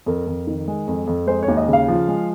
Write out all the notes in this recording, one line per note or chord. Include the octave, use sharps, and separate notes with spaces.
F2 A#4
F2
D#3
G#3
F2
F2
G#3 C5
C#5
D#2
D#5
C#3
F5
F3
G#3